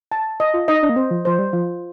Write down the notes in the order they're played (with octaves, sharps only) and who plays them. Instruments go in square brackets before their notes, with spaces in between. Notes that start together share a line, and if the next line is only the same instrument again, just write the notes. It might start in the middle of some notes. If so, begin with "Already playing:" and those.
[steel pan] A5
D#5
[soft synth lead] F4
[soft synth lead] D#4 [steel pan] D#5
[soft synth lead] D4
A#3
[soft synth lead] C4 [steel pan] C5
[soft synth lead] F3
[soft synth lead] F3 [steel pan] C5
[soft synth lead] G3
[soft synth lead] F3 [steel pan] F4